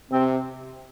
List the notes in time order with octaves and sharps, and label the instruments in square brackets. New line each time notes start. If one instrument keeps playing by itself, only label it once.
[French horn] C3 [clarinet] C4